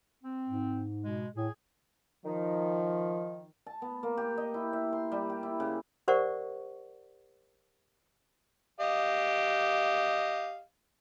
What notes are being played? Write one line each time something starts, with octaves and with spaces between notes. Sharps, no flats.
C4
G#2
B2 G#3
A2 G#4
D#3 F3
A5
B3
A#3
G4
D#5
E4
E5
C6
G3
G4
E4
C#3
G4 A#4 C5 D5 F#5 C#6
G4 D#5 F5